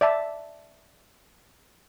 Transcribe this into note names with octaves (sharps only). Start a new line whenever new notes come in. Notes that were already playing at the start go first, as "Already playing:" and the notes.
D5 E5 A5